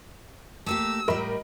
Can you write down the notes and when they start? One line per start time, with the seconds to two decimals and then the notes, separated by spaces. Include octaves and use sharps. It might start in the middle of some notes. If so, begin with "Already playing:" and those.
0.66 A3 A#3 G4 E6
1.08 A2 G3 A#4 D#5 B5